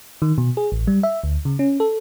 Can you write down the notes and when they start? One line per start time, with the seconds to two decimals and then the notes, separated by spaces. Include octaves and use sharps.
0.22 D#3
0.38 B2
0.57 G#4
0.72 A1
0.87 G3
1.03 E5
1.24 D2
1.45 C#3
1.59 C#4
1.80 A4